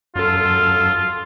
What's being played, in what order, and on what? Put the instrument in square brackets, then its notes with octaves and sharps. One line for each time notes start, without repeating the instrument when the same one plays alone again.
[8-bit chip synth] F#2 A4 [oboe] F4